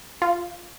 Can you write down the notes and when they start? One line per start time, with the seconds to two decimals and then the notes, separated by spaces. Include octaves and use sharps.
0.22 F4